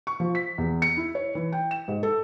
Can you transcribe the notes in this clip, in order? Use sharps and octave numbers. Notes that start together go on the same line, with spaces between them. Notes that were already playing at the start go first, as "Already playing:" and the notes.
C#6
F3
B6
E2
C#7
E4
C#5
E3
G5
E7
G#2
A4